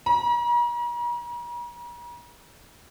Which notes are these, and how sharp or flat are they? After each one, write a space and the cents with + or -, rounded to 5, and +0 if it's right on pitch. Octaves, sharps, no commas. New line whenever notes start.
A#5 +45